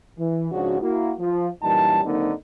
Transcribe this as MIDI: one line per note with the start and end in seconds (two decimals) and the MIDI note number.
0.18 0.50 52
0.51 0.79 44
0.51 0.79 49
0.51 0.79 53
0.51 0.79 61
0.51 0.79 62
0.51 0.79 66
0.80 1.12 58
0.80 1.12 64
0.80 1.12 66
1.19 1.48 53
1.63 2.01 42
1.63 2.01 46
1.63 2.01 52
1.63 2.01 55
1.63 2.01 63
1.63 2.01 81
2.05 2.31 50
2.05 2.31 51
2.05 2.31 54
2.05 2.31 58
2.05 2.31 60
2.05 2.31 63